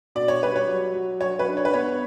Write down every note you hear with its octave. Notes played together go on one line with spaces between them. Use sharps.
B2 D5
C#5
G3 B4
C#5
F#3
F#3
F#3 C#5
B4
D4
C#5
B4
B3 C#5